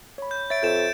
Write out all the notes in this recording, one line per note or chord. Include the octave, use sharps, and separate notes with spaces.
C#5 B5
G6
C#5 E5 A6 D7
F2 G6 E7